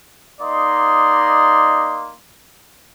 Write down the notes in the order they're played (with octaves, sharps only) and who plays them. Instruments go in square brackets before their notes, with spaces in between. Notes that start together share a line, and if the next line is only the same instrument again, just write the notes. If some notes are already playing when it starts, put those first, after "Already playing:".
[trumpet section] A#3 D#4 D5 D#5 C6